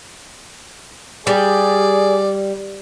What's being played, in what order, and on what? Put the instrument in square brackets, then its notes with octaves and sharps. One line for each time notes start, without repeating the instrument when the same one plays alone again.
[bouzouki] G3 [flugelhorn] G#4 [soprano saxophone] D5